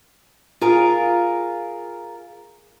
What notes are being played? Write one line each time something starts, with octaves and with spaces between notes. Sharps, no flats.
F4 G#4 A#4 F5